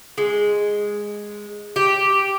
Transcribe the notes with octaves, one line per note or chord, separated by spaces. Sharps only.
G#3
G4